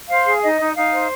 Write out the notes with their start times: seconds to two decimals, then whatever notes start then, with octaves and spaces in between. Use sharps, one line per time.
0.10 C5 F5
0.26 G#4
0.43 D#4 D#5
0.60 D#4
0.76 D#4 F5
0.93 C5